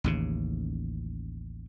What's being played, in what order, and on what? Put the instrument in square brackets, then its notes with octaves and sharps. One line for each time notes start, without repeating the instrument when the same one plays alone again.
[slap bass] A1 D#2 C#3